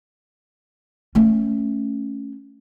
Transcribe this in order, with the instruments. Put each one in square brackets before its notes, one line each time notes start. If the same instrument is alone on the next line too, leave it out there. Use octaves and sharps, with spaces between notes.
[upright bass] A3 C#4